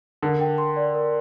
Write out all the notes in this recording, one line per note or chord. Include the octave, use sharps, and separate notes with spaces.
D3 A#4
G5
C6
D5
A#4